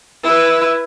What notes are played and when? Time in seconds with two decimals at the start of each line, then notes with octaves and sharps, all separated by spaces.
0.23 E4 B4